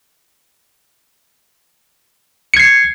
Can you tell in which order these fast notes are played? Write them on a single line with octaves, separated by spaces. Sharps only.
C#7 G#6 C7